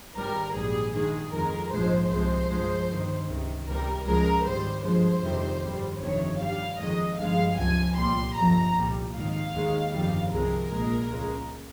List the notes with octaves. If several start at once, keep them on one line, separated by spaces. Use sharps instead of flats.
G#1 G#2 G3 A#4
A#1 G#2 G3 G#4
G2 D#3 G#3 G#4
F2 D#3 G#3 A#4
A#1 G#2 F3 G#3 C5
C2 C3 F3 G#3 C5
G2 F3 G#3
G1 G2 D#3
C#2 C3 D#3
C#2 C3 G3 A#4
C#2 C#3 F3 G#3 A#4
G#1 G#2 G3 C5
G2 F3 G#3 C5
F2 C3 D#3 G3
G#1 G2 G3
G1 F2 C3 D#3 C#5
G2 G3 F5
F2 D#3 G#3 D#5
G1 G2 F3 G#3 F5
C#2 C3 F3 G#5
C2 A#2 G3 C6
G1 F2 C3 F3 A#5
C2 A#2 G3
G#1 G#2 D#3 F5
D#2 D#3 G#3
G1 F2 D#3 G3
C2 C3 F3 G#3 A#4
A#1 A#2 G#3
C#2 C#3 G#3